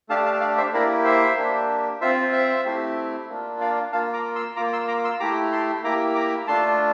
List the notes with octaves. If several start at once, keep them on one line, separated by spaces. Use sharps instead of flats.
A3 D4 G4 F5 A5
F5 A5
D5 F5
C5 E5
A#3 E4 G4 A#4 D5
C5 E5
A#3 D4 G4
C4 F4 C5 E5
C5 E5
A3 C4 E4 G4
A#3 D4 F4
D5 F5
A#3 F4 F5 A5
A#5 D6
C6 E6
A#3 F4 A#5 D6
C6 E6
A#5 D6
C6 E6
A3 E4 G4 A#5 D6
A5 C6
A#3 E4 G4 A#5 D6
A#5 D6
A3 D4 F4 A5 C6